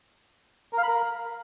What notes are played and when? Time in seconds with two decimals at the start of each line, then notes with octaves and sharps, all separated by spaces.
0.73 A#4
0.78 F5
0.83 B5
0.88 A#4